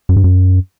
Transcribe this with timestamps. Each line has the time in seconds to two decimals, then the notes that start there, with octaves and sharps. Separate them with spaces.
0.09 F#2
0.16 G2
0.24 F#2